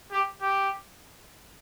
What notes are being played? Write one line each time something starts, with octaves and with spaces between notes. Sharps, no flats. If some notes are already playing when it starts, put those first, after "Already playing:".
G4
G4